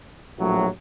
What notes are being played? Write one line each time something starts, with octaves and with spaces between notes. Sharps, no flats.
A#1 A2 F#3